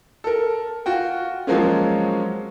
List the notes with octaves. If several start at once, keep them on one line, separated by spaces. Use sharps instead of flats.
A4 A#4
F4 F#4 G5
F3 F#3 G#3 A#3 C4 C#4